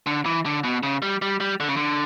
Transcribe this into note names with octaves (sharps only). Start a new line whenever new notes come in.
D3
E3
D3
B2
C#3
G3
G3
G3
D3
C#3
D3